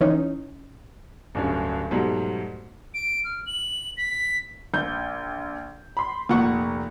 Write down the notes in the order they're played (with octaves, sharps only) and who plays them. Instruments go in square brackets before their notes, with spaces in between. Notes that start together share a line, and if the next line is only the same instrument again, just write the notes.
[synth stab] E3 C#4 D#4
[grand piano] D1 G2 C#4
G#2 B2 F#3 G3 A3
[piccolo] D7
F6
F#7
B6
[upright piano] A#1 G6
B5 C6
[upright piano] F1 [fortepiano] A#2 F#5 C#6